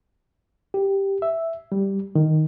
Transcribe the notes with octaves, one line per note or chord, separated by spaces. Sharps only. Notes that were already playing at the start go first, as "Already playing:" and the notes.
G4
E5
G3
D#3